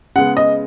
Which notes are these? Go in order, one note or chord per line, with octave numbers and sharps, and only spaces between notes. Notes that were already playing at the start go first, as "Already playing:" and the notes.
C#3 G#3 B3 F#5
D#5